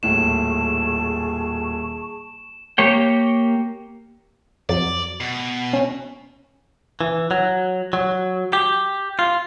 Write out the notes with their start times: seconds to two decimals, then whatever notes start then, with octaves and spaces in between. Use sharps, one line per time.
0.03 D#1 A2 G#4 A5 C#6 E7
2.78 A#3 G4 C#5 G5
4.69 F2 F#3 D5
5.20 B2
5.73 C#4
7.01 E3
7.31 F#3
7.93 F#3
8.53 G4
9.19 F4